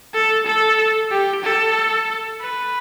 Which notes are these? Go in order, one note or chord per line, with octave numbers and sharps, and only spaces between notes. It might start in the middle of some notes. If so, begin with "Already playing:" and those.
A4
A4
G4
A4
B4